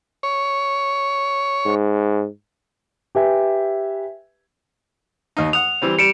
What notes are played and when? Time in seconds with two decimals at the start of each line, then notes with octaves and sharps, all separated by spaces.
0.23 C#5
1.66 G#2
3.15 G4 B4 E5 G#5
5.37 D#2 D#4
5.53 F#5 D#6 F7
5.82 E3 G3 C4
5.99 G3 C#7 D7 E7